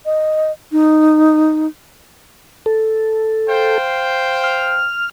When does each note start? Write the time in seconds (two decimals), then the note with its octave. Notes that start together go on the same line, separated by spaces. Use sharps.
0.05 D#5
0.72 D#4
2.66 A4
3.48 C5 F5 G5
4.44 F6